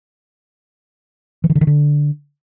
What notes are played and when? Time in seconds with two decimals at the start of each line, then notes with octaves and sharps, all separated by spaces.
1.44 E3
1.50 D#3
1.55 D3
1.61 D#3
1.67 D3